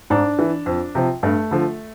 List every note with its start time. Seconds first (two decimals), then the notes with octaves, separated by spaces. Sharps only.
0.10 G#2 D4
0.39 E3
0.66 F2
0.95 C3 F3
1.23 G2 A3
1.51 D3 F3